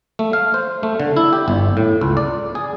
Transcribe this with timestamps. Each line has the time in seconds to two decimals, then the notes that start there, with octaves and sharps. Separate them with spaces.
0.19 A3
0.33 F5
0.54 C5
0.83 A3
1.00 D3
1.16 E4
1.33 G4
1.48 G1
1.77 A2
2.01 C#2
2.17 D5
2.55 G#4